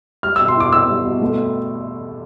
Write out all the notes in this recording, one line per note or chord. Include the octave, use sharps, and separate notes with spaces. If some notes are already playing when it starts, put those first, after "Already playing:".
G3 F6
B2 E6
C6
E4 D6
B3 E6
G3
B2
A3